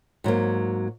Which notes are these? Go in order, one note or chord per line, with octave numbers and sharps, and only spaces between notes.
G#2 F#3 A#3